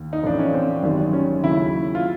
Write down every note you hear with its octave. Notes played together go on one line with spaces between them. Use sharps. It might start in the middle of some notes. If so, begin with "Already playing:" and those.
Already playing: D#2
D#4
A1 A2 F3 D4
C#4
C4
G#1 F#2 D#3 G3
C#4
D#2 C#3 F#3 E4
F4